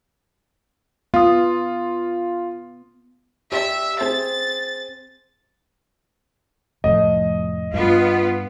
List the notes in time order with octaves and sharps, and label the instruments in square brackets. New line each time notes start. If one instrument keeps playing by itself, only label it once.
[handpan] B3 [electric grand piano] F4 [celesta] F5 D#6
[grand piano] G4 D5 [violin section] E5
[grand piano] C4 G#4 [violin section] A6
[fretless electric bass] F1 A2 F3 [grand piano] D#5
[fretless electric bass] G2 [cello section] B3 F4